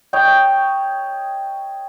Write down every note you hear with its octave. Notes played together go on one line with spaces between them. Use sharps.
C#5 D#5 G5